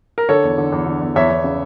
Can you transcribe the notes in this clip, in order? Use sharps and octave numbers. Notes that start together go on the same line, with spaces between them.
A#4
D3 A4 C#5
E2
D3
E2
D3
E2
E2 C#5 E5
E2
C#3